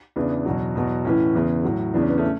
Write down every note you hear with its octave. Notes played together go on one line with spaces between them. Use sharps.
E2 C#3 E3 B3 D4
E2 B2 F#3
E2 B2 F#3
A2 E3 C#4 E4
E2 C#3 E3
A2 F#3
E2 C#3 E3 D4
C#4
B3
A3 C#4